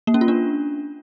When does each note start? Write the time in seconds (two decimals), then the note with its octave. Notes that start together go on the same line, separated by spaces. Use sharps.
0.07 A#3
0.14 C#4
0.21 F4
0.28 D4